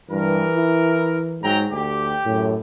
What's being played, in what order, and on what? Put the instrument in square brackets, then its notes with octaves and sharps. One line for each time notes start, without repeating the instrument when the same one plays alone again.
[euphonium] G2 [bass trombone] E3 [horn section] A#4
[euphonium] E4
[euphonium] G#2 [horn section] F#3 G5 A#5
[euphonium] D2 [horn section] G4
[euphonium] F#2 [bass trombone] A2